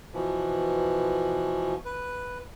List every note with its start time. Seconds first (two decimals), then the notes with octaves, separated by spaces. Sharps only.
0.13 B2 E3 F3
1.85 B4